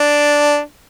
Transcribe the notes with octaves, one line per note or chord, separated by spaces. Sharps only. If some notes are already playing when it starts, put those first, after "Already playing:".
Already playing: D4